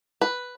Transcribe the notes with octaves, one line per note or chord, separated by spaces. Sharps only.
B4